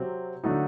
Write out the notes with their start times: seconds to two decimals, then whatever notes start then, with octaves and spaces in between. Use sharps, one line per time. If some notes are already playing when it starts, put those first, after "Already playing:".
Already playing: C3 F#3 C4
0.44 D3 F#3 A3 D#4